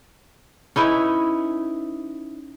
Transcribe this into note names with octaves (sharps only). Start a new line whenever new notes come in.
C#4 D#4 E4 B4